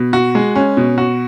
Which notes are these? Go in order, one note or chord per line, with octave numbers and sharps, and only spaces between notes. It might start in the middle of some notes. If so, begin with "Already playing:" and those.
Already playing: B2
F#4
G#3
C#4
B2
F#4